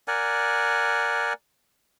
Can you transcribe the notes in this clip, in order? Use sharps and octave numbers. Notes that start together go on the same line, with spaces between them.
A#4 D5 F#5 G#5